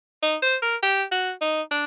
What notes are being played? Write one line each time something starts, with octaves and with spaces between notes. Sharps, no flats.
D#4
C5
A#4
G4
F#4
D#4
D4